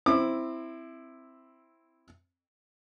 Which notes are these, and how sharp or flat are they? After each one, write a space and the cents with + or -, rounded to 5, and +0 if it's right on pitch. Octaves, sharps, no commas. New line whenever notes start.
C4 +0 E4 +0 D6 +35